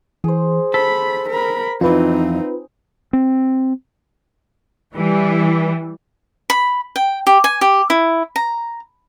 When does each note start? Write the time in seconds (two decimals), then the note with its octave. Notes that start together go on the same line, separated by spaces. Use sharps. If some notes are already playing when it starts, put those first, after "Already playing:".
0.24 E3 G#4 C5
0.74 A4 C5 B5 B6
1.30 A#4 B5
1.81 F2 E3 C4 D#4 F4 B4
3.13 C4
4.95 E3 G3
6.50 B5
6.96 G5
7.27 G4
7.44 G#5
7.61 G4
7.90 E4
8.36 A#5